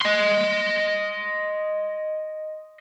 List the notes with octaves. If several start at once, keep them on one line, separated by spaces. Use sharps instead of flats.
D#5 C6